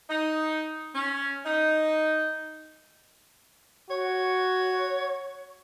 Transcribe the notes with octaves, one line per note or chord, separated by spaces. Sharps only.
D#4
C#4
D#4
F#4 C#5